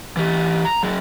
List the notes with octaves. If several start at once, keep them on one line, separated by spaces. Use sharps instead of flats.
E3 G4
A#5
F#3 G#4